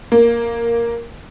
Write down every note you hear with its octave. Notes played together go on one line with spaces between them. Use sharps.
A#3